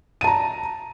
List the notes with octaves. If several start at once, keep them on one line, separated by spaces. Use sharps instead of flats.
A5 A#5 D#7